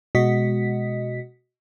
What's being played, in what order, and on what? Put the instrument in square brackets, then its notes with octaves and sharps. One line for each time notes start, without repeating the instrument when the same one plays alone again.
[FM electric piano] B2 G#3 F#4 D#5 B6